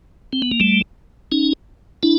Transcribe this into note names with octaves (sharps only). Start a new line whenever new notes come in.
C4
B3
A#3
G3 A3
C#4 D#4
D4 E4